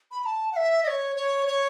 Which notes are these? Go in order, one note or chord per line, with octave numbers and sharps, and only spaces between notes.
B5
B5
A5
F#5
E5
D#5
C#5
C#5
C#5